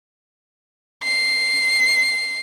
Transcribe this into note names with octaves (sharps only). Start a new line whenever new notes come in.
C7